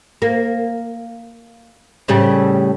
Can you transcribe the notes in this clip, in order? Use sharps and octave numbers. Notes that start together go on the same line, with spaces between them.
A#3
A2 C#3 G3